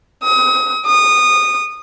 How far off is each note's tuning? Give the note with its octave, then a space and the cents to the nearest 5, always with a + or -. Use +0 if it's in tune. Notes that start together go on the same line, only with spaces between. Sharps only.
D#6 +35
D#6 -20